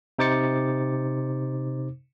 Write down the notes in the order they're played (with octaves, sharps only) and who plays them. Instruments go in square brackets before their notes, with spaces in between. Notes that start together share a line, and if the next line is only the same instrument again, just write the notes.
[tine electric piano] C3 D#4 C5 D6 A6 C#7